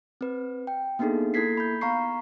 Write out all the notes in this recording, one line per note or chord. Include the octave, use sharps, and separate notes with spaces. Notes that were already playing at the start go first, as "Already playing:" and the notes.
C4 B4
G5
A#3 B3 D4 D#4 G#4 A4
A#3 E4 A4 G#6 B6 C7
B5 G6
B3 F5 A#5 C#6 C7